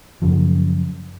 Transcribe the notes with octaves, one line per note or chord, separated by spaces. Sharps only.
F#2 C#3 F3